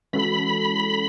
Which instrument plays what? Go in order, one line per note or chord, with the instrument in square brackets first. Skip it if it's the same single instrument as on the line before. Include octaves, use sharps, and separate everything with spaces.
[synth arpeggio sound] E3 G#3 C#4 F#4 A4 [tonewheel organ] B5